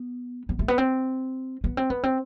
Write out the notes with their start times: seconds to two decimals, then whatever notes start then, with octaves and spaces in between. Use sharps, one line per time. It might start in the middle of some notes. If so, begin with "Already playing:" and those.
Already playing: B3
0.49 B3
0.59 A3
0.68 B3
0.78 C4
1.64 B3
1.77 C4
1.90 B3
2.04 C4